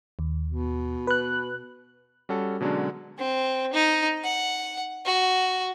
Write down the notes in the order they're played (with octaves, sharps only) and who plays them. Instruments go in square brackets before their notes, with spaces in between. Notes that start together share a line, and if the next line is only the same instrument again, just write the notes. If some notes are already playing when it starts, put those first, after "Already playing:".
[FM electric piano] D#2
[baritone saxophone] B2
[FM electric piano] B4 F#6
[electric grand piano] G3 C#4 F#4 A4
B2 D3 F#3 G#3 C#4 D4
[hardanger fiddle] C4
D#4
F#5
F#4